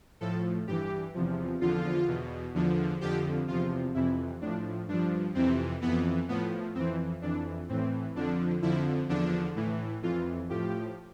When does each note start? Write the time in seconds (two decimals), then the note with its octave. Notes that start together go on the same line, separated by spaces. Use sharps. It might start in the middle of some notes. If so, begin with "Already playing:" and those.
0.21 A2 F3 A4
0.67 G2 E3 G4
1.14 E2 C3 F3
1.61 E2 D3 F3 F4
2.08 E2 B2
2.55 E2 D3 F3
3.01 F2 D3 F3 G4
3.48 E2 C3 F3 F4
3.94 F2 C3 E3 E4
4.41 A2 F3 D4
4.88 G2 F3 D4
5.34 F2 C3 E3 C4
5.82 F2 E3 B3
6.29 A2 F3 B3
6.75 F2 E3 C4
7.22 F2 E3 D4
7.69 A2 E3 C4
8.15 F2 D3 F3 D4
8.62 F2 D3 F3 E4
9.09 E2 D3 F3 D4
9.56 A2 E3
10.03 F2 E3 F4
10.50 A2 F3 G4